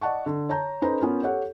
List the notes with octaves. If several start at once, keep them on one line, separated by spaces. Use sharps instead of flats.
D5 D#5 F#5 A5 C#6
D3
C#5 A5 A#5 G6
C#4 D#4 A4 B4 C5 A#5
B3 C#4 F4 A#4
G4 A4 C#5 F#5